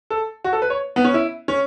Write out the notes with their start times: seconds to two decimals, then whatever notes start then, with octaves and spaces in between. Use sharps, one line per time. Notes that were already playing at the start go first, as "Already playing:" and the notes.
0.10 A4
0.44 F#4
0.53 A4
0.62 B4
0.70 C#5
0.96 B3
1.04 C#4
1.14 E4
1.48 C#4